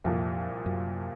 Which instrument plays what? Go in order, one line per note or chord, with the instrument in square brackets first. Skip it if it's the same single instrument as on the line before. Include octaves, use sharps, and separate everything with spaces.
[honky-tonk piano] C2 A#2 F3 [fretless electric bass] F2
[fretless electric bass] F#2